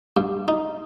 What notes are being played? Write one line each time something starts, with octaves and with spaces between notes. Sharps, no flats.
G2
D#4